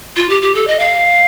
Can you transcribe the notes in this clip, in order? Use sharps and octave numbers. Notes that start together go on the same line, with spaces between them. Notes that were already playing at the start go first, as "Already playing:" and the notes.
F4
G4
G4
A4
D#5
F5